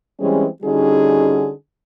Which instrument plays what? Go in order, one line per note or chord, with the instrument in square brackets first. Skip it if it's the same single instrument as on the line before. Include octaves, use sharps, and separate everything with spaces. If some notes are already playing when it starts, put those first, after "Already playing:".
[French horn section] E3 G3 G#3 C4 C#4 G#4
D3 G3 C#4 D#4 F#4 G#4